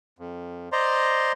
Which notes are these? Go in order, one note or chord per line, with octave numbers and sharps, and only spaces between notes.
F2
C5 D5 D#5 A#5 C6